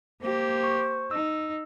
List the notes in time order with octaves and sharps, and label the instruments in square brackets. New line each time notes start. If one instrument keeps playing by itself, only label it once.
[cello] A#3 G4 [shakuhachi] C5
[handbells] C#6
[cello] D#4 [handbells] E6